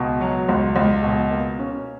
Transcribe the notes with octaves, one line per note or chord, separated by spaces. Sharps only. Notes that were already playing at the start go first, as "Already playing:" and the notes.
Already playing: C#2 B2
F#3
C#2
C#2
B2
A#3
C#4